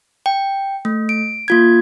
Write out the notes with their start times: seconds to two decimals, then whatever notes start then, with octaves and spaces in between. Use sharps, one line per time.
0.26 G5
0.85 A3
1.09 D7
1.48 A#3 F4 G#6